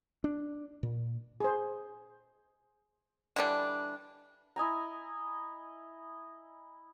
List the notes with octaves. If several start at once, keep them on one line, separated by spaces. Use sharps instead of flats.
D4
A#2
G#4 C5
D3 E3 G3 D4
E4 D#5 G#5 A#5